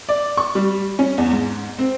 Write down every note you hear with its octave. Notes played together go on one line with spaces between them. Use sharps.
D5
C#6
G3
C#4
E2
G#2
C4